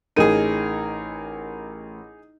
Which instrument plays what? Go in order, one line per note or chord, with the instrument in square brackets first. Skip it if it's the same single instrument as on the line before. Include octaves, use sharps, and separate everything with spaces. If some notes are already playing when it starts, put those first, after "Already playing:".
[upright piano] A1 A#4 D#7 [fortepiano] D#4 G#4